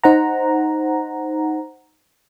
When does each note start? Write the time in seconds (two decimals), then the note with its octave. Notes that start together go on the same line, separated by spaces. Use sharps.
0.04 D#4 C5 F#5 A#5